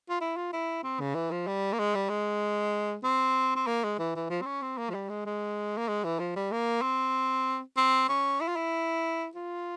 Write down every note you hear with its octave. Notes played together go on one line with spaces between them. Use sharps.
F4
E4
F4
E4
C4
C#3
E3
F3
G3
A#3
G#3
G3
G#3
C4
C4
A#3
G#3
E3
E3
F3
C4
C#4
C4
A#3
F3
G3
G#3
G#3
A#3
G#3
E3
F3
G3
A#3
C4
C4
C#4
E4
F4
E4
F4